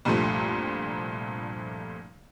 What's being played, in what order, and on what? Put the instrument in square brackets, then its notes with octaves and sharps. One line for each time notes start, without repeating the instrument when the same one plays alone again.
[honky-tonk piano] C2 G2 A#2 F3 A3